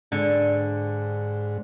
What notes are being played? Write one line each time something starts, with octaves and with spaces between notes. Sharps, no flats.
G#2 D3